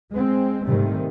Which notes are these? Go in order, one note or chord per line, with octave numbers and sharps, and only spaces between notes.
G#3 C4
G#2 C3 D#3 G3 A3